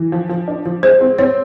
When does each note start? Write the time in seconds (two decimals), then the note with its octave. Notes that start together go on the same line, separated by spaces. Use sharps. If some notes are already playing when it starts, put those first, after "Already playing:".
Already playing: E3
0.12 F3
0.29 F3
0.48 D4
0.65 F3
0.83 G#3 C5
1.01 C4
1.19 C4 C#5